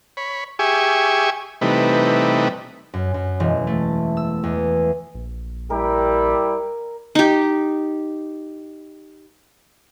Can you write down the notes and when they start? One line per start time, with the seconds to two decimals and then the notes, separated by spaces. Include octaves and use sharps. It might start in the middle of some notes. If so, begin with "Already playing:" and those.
0.17 C#5 B5
0.59 G4 G#4 E5 G#5 C#6
1.61 C3 E3 G3 A3 D#4 B4
2.94 F#2
3.14 F#2
3.40 E1
3.67 A3
4.17 E6
4.44 E2
5.14 A#1
5.70 G3 E4 G4 A#4
7.15 D#4 G4